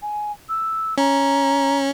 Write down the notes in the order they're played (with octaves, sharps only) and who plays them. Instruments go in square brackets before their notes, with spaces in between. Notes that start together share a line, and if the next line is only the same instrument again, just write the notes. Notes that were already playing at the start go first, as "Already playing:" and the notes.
[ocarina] G#5
E6
[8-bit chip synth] C#4 [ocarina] A#5